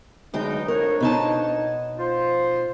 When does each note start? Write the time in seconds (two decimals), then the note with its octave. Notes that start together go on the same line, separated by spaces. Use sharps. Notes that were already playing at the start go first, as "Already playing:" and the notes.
0.34 D2 B2 F#3 G#3 D#4 G5
0.68 F2 D4 A#4 C#5
1.00 B2 D#4 A5
1.98 F4 C5